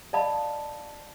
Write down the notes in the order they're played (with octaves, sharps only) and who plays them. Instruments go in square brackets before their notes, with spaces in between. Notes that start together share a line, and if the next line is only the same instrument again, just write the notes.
[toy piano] D5 D#5 F5 A5 B5 D#6